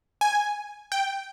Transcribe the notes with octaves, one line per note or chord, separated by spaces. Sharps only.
G#5
G5